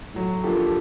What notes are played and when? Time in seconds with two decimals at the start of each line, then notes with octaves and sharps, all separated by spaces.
0.14 A2 F#3 A3
0.44 D3 F3 A#3 G4 A4
0.58 G4 A4